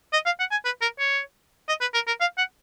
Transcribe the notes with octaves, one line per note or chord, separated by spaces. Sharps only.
D#5
F5
F#5
G#5
B4
A#4
C#5
D#5
B4
A#4
A#4
F5
F#5